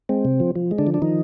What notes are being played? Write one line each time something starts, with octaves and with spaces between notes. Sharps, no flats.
G#3 C4
C3
F3
F3
G#3
D3 D4
F3
D4
D#3 F3 D#4